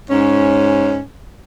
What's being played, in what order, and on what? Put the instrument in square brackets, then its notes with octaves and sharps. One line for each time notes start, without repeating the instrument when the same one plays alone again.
[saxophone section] G#2 C#4